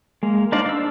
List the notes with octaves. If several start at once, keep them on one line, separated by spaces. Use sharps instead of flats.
G#3 A#3
D4 D#4 C5 D5 F5
D4 E6